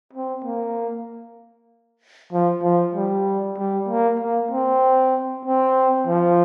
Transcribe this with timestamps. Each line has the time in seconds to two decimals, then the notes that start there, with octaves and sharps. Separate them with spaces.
0.13 C4
0.44 A#3
2.33 F3
2.63 F3
2.95 G3
3.58 G3
3.89 A#3
4.19 A#3
4.51 C4
5.45 C4
6.07 F3